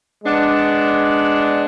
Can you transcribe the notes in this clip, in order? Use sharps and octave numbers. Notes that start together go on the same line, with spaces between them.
G#3 B3 D4